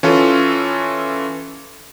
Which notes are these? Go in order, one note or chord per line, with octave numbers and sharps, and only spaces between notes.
E3 C#4 F4 A4